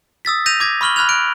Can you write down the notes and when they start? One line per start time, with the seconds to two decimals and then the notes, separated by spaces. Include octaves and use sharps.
0.25 D#6 E6 A6 B6
0.46 G6 A#6 D#7 F7
0.60 D6 G#6 A#6
0.81 B5 C#6 F6 F#7 G7
0.96 B5 F6 F#6 G#6 F7
1.09 F#6 D7